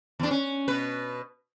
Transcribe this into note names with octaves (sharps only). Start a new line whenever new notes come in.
E2 D4
C#4
B2 B4